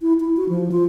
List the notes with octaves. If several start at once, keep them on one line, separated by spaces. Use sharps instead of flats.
E4
E4
F#4
F3
F4